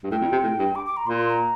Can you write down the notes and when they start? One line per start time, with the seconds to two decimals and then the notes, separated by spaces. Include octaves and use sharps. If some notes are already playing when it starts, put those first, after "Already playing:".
0.03 G2
0.11 A2 G5
0.22 F2
0.32 C3
0.44 A2
0.59 G2
0.75 D6
0.86 D6
0.97 A#5
1.07 A#2 C6
1.18 C6
1.29 A#5